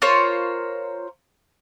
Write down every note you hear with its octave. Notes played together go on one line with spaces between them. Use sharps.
F4 A#4 C5 C#5